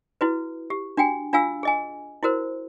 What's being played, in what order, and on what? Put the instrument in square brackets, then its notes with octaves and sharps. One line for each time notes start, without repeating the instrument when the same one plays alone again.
[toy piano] E4 F#4 B4
G4
D4 F#4 G5 G#5
D4 F4 F5 G#5 E6
G#4 D#5 G#5
E4 F#4 A#4 C5